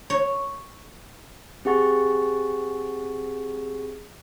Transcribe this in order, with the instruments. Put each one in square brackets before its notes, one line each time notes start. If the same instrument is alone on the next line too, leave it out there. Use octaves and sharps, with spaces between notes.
[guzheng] C#5
[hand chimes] C4 G4 G#4 F#5 C#6 A6